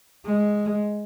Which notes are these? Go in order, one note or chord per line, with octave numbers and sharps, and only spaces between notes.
G#3